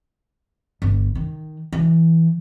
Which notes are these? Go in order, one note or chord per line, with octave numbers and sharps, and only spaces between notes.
G1
D#3
E3